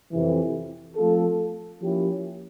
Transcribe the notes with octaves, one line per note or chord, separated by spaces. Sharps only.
F2 C3 E3
F3 A3 C4 F4 A4
F3 A#3 C#4 E4 G4